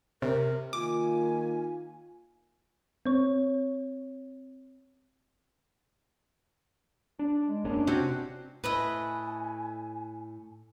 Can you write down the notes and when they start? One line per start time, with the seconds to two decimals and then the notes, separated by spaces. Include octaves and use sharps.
0.22 C3 A#4
0.73 D#3 A#3 F4 G#5 D6
3.06 C4 C#5
7.19 D4
7.46 G#3
7.64 F1 A#3 C#4 D4
7.87 C3 C4 C#4 F#4
8.64 A2 B4 D#5 E5 G#5